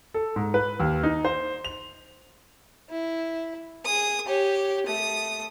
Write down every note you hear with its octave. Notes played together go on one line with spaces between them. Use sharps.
A4
G#2
B4
D#2
D#4
C5
F7
E4
G#4 D#6
G4 C#5
A3 D#6